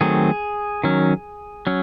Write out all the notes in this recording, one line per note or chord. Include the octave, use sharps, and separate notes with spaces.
D#3 F#3 A3 C4 G#4
D#3 F#3 C#4
F#3 C#4